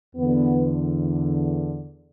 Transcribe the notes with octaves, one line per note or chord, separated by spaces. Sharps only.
E2 D3 B3